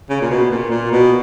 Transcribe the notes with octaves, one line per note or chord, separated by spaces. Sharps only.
C#3
A#2
B2
A#2
A#2
B2